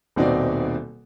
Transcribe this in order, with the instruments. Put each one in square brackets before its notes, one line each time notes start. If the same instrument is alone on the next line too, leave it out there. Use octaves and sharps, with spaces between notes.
[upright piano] D#1 B2 C4 D#4 F#4 D5